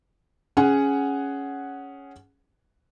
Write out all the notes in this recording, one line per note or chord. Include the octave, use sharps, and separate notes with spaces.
C#4 G#4 F#5